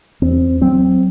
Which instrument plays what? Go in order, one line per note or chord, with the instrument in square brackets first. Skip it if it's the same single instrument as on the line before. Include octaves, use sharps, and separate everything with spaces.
[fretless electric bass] E2 [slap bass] C4
[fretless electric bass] F#3 [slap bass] C4